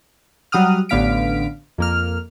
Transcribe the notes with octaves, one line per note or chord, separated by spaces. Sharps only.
F#3 G3 F#5 D#6 F6
A1 D3 B3 F5 B6 D7
F2 A#3 F6